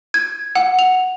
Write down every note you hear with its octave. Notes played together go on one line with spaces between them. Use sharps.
G#6
F#5
F7